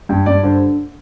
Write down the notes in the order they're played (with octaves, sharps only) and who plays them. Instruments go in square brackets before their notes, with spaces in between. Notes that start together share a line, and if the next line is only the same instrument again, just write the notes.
[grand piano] G2 G5
G2 D5
D3 C5